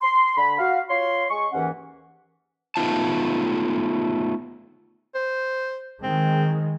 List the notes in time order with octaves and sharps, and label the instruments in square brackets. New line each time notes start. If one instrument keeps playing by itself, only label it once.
[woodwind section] C6
D3 B5
F#4 F5
F4 C#5 C6
G#3 C#6
D#2 G#2 E3 C#4 F#5
[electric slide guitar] A3 B3 D#4 F4 A5
[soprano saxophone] C5
[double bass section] D#3 G#3 [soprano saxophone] C4